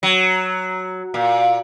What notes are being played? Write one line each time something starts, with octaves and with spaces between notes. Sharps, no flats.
F#3
A#2